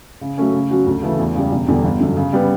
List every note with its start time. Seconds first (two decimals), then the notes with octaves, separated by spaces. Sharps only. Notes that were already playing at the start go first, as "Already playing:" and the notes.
0.21 C#3
0.37 F#3 A3 C#4
0.53 C#3
0.70 F#3 C#4 F#4
0.87 D2
1.02 C#3 E3 A3 E4
1.19 E2
1.35 C#3 G3
1.51 E1
1.68 E2 D3 G3
1.84 G1
2.00 F#2 D3
2.17 C#3
2.33 G3 B3